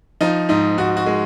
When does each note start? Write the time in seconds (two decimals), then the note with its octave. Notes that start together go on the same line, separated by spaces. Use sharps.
0.21 F3 D#4
0.49 G#2 D#4
0.77 G#2 F#4
0.97 F#4
1.06 G#3